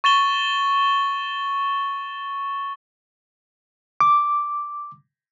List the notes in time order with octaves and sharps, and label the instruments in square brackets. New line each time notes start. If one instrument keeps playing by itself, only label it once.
[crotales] C#6 A6 E7 G7
[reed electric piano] D6